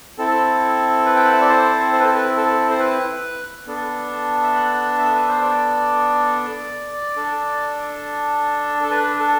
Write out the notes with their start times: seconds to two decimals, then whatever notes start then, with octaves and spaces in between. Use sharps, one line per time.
0.18 C4 E4 A4
1.06 B4
1.16 G5
1.25 F#5
1.33 E5
1.41 D5
1.49 C5
1.93 C5
2.00 B4
2.07 A4
2.14 B4
2.37 A4
2.70 C5
2.80 B4
3.67 B3 D4 A4
4.43 E5
4.55 F#5
4.98 E5
5.15 B4
5.29 C5
5.41 D5
7.16 D4 A4
8.83 A4
8.91 B4
9.19 A4